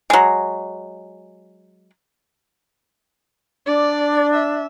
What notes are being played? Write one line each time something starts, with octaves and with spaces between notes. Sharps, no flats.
F#3 G#3
D4 D5
E5